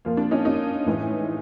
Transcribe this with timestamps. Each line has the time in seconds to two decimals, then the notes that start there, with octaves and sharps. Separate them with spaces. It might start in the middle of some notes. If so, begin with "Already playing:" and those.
0.05 A#2 F3 A#3
0.17 D4
0.31 C#4 D#4
0.45 C#4 D#4
0.86 A2 E3 G#3